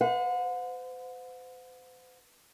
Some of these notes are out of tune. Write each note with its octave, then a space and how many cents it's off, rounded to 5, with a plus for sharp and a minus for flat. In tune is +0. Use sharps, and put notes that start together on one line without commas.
C5 -45 F#5 -40